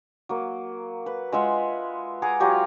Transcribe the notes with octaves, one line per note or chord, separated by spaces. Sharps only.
F#3 A#3
B4
G#3 F4 E5 F#5
G#4 F#5 A#5 D6
F#3 F4 G4 F5